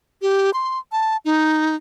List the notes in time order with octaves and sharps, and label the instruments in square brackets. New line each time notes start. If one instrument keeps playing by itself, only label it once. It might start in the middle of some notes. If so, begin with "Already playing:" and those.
[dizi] G4
C6
A5
D#4